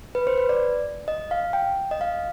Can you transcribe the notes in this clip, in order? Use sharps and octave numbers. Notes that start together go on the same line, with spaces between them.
B4
C5
B4
D5
D#5
F5
G5
D#5
F5